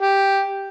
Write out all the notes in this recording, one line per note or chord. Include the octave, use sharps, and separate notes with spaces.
G4